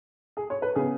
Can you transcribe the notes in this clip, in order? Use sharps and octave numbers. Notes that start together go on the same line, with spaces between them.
G#4
C#5
B4
C#3 B3 G#4